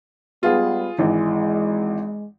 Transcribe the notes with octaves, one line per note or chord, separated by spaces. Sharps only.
G3 G#3 B3 F4 G#4
G#1 E3 G#3